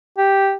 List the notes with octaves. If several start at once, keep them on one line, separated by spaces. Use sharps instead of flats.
G4